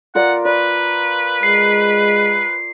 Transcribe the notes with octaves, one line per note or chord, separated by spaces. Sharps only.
F4 A#4 D5 F#5
B4 D5
G#3 C7